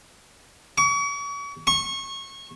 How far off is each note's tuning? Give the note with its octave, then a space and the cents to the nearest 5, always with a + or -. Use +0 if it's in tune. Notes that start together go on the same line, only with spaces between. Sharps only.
C#6 +40
C#6 -25